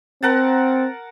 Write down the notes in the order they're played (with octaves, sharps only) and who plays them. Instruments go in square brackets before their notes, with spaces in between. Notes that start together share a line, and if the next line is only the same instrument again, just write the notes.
[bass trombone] C4 [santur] A#4 F#5 A5